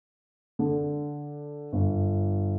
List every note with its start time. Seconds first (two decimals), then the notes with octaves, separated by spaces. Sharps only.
0.59 D3
1.72 G1